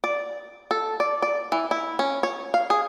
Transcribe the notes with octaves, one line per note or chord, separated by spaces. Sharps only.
D5
A4
D5
D5
E3
E4
C#4
C#5
F5
G#4